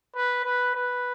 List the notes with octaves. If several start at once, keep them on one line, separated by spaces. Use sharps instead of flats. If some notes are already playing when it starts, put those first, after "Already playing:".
B4
B4
B4